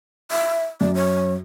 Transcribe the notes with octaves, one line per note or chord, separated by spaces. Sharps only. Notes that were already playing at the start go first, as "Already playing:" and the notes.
E5
F#2 D5
C#5